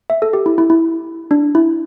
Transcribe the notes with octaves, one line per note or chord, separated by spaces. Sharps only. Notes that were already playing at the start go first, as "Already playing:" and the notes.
E5
A4
G4
E4
E4
E4
D4
E4